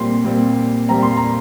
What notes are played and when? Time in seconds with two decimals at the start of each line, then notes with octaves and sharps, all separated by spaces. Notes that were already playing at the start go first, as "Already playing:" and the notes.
Already playing: A#2 G3 C4 C6
0.25 A#2 G3 C4
0.89 A#2 G3 C4 A#5
1.03 C6
1.17 A#5